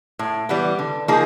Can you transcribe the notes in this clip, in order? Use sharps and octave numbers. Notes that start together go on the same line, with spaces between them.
A2
E3 G3 B3
D3
F3 A#3 D#4 G#4